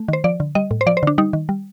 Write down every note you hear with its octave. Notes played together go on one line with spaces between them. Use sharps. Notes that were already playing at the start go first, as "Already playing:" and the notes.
Already playing: A3
D#3 C5
F3 D5
D3
G3 D#5
A2
C5
F3 D5
C5
D3 D4
G3 D#4
D#3
G3